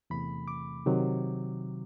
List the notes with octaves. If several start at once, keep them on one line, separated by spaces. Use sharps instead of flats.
E2 C3 E3 A3 B5
D6
C3 D#3 F#3